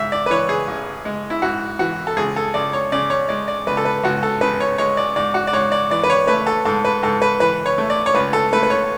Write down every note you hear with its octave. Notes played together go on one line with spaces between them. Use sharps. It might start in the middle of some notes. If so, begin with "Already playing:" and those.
Already playing: G#2 E5
D5
B4
E3 C#5
G#4
A1
G#3
E4
G#2 F#4
E3 F#4
A4
C#2 G#4
A4
C#2 D5
C#5
C#3 D5
C#5
G#3 D5
D5
C#2 B4
A4
B4
C#2 F#4
A4
C#3 B4
C#5
G#3 C#5
D5
G#2 D5
F#4
D5
G#2 C#5
D5
E3 D5
B4
C#5
A3 B4
A4
G#2 A4
B4
G#2 A4
B4
E3 B4
C#5
A3
D5
C#5
C#2 B4
A4
A3 B4
B4
C#5